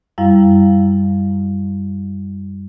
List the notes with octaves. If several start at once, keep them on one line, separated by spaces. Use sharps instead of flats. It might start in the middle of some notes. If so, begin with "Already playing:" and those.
F#2 G3 E4 F5